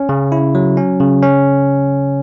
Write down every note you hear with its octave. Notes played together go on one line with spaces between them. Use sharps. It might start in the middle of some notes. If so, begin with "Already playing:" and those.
Already playing: C#4
C#3
E4
F#3
C#4
C#3
C#4